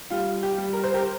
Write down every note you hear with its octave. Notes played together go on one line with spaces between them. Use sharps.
G3 F4
G4
G3
A#4
C5
G4 A#4